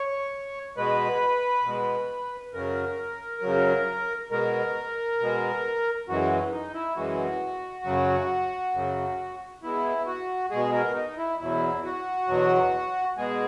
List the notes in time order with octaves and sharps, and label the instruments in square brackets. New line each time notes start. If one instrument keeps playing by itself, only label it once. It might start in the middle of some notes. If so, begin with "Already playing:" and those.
Already playing: [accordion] C#5
B2 G#3 B4
B2 G#3
F#2 C#3 F#3 A#4
F#2 C#3 F#3
B2 G#3 A#4
B2 G#3
F#2 E3 G#3 F#4
D#4
E4
F#2 E3 G#3 F#4
F#2 C#3 F#3
F#2 C#3 F#3
B2 G#3 E4
F#4
B2 G#3 G#4
A#4
D#4
E4
E2 B2 F#3 E4
F#4
E2 B2 F#3
B2 G#3 G#4